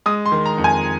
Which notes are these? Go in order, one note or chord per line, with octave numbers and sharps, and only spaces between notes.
G#3 D#6
C6
D#3
A#5
F2
G#5